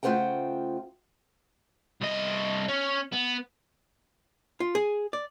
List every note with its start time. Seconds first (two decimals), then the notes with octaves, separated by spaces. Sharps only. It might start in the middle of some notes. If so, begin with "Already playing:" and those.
0.03 C#3 A3 F4 C5 F#5 G5
2.01 C2 D#5
2.68 C#4
3.12 B3
4.60 F4
4.75 G#4
5.13 D5